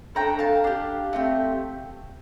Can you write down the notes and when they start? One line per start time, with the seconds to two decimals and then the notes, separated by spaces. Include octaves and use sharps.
0.15 A3 D4 A4 G5 A#5
0.39 F5 A5
0.64 D4 G4
1.13 A3 C4 G4